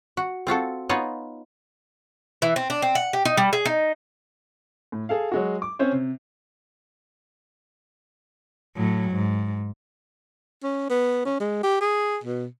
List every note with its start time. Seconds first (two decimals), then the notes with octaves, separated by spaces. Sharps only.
0.17 F#4
0.47 C4 F4 F#4 A4
0.89 B3 D#4 F4 C#5 D#5
2.42 E3
2.56 C4
2.70 D4
2.82 C4
2.95 F#5
3.13 G4
3.25 D#4
3.37 G3
3.53 G#4
3.65 D#4
4.92 A2
5.09 G#4 A4 F5
5.32 F#3 G#3 F#4
5.62 D6
5.79 C4 C#4 C5 C#5
5.92 C3
8.76 A2 F#3
9.12 G#2
10.63 C#4
10.90 B3
11.25 C#4
11.40 G#3
11.63 G4
11.81 G#4
12.23 B2